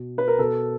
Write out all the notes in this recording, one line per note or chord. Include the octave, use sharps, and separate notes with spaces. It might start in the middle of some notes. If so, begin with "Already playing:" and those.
Already playing: B2
B4
A#4
B2 A4